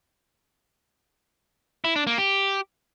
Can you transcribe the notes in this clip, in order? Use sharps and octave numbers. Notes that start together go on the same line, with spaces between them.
E4
D4
A#3
G4